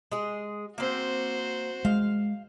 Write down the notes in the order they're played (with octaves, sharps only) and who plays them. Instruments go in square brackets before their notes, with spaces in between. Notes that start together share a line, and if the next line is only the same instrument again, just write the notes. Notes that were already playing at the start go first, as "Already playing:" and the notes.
[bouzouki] G#3 G#4
[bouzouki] A#3 C4 [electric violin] F#4 C5
[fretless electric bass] G#3 [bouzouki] F5